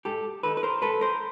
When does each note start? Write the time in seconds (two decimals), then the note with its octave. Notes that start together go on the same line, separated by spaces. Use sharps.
0.05 G#2 G4 A4
0.43 D#3 A4 B4
0.57 B4
0.63 A#4 C5
0.82 G#2 A4 B4
1.01 A#4 C5